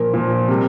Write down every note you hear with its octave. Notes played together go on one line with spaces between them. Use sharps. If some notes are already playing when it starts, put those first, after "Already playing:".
Already playing: A#2 F3 A#4
A#2 F3
C3 G3